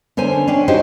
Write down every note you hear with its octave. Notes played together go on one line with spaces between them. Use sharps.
D3 C#4 C5 G#5
C#4 D4 G5
D#4 F#4 G4 C5 C#5